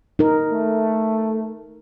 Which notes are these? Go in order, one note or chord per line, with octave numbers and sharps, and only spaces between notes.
D#4 A#4
A3